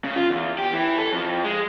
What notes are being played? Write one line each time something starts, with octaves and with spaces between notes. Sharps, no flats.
C#3
F4
E2
G4
E3
A4
F2
G#3